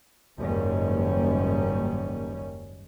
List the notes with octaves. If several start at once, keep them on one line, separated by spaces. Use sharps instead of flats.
F#1 D#2 G#2 D#3 G3 C#4